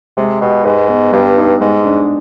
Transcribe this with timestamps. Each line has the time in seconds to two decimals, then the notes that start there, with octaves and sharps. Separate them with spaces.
0.17 C3 G#3
0.41 B2 G4
0.65 G#2 B4
0.88 B3
1.12 G2 G3
1.37 D#4
1.60 G#2 G#3
1.84 D4